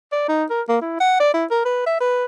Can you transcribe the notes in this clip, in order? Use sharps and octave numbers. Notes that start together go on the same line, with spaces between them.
D5
D#4
A#4
A#3
E4
F#5
D5
E4
A#4
B4
E5
B4